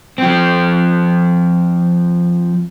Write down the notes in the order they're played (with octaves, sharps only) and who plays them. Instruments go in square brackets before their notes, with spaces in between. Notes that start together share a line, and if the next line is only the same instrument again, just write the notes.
[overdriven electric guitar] F3 C4